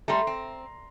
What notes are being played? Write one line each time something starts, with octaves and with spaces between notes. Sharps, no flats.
G3 A3 A#5 C6
C4